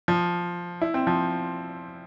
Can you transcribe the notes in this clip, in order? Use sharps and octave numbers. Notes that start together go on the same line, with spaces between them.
F3
E4
C4
F3